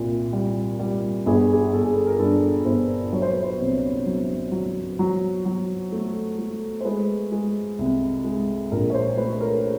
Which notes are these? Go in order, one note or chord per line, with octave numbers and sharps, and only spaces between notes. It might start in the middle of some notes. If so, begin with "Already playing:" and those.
Already playing: C2 A#2
G3
G3
G1 G#4
G#4
G1 A4
G#4
A4
A#4
G2 A4
G1 C5
F#3 C#5
C5
B4
C5
C2
F#3
F#3
F#3
F#3
A3
A3
C5
G#3 B4
G#3
C2
G#3
A#1 A#4
C#5
C5
A3 B4
A#4